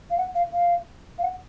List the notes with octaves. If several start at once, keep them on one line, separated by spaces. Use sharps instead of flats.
F5
F#5
F5
F5
F5
F#5